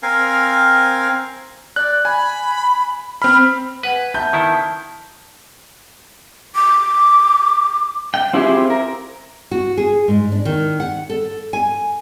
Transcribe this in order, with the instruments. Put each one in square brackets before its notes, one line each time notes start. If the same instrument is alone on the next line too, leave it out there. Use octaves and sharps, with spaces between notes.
[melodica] C4 A#4 F5 G#5
[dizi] D5 [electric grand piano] F#6
[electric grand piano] G#5 [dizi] B5
[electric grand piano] C4 B5 [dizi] F6
[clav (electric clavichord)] B4 [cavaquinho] F#5 G#5
[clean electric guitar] B3 A5 [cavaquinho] E5 [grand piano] G6
[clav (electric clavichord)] D#3 E4
[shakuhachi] D6
[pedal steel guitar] G5
C4 E4 F4 G4 G#4
A#4
[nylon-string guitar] F#4
G#4
G#2
D4
D#3
F#5
A4
G#5